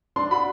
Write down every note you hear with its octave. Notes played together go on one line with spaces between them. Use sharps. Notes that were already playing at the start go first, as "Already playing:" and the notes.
D4 C6
F#4 B5